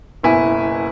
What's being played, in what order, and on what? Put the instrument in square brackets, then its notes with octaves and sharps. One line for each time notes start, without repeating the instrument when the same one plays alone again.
[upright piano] F#1 B2 E4 G#5